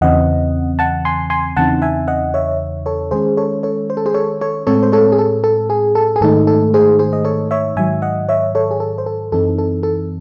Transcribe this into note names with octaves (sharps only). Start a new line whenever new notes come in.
E2 C#3 E3 C4 D#5 F#5
F#5 A5
G#5 C6
G#5 C6
E2 C#3 E3 C4 D#4 F#5 A5
E5 G#5
D#5 F#5
C#5 E5
A4 C#5
D#3 G#3 C#4 G#4 C5
A4 C#5
A4 C#5
C5
A4
G#4 C5
A4 C#5
A4 C#5
A2 G#3 C4 A4 C#5
C5
A4 C#5
G#4
A4
A4
G#4
A4
G#4
G#2 D#3 A3 D#4 A4
A4
G#4 C5
G#4 C5
D#5
A4 C#5
C#5 E5
G#2 D#3 F#3 E5 G#5
D#5 F#5
C#5 E5
A4 C#5
G#4
A4
C5
A4
F#2 E3 C4 D#4 A4
A4
A4